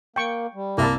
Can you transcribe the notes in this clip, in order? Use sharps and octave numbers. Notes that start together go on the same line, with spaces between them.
A#3 G5 C#6
G3
C2 A#3 E4 E5 A5